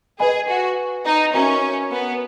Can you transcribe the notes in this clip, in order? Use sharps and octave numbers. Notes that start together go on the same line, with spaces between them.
G#4 B4 D#5 G#5 B5
F#4
D#4
C#4 F#4 A#4 E5 A#5
B3